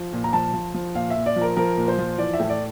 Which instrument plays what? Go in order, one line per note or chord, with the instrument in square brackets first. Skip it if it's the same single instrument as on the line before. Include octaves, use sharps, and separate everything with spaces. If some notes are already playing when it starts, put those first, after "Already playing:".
Already playing: [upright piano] F3
A#2
A#5
F3 A5
F3
F3
A#2 F5
E5
A#2
D5
F3
A#4
F3 A#4
A#2
C5
F3
E3 D5
E5
A2
D5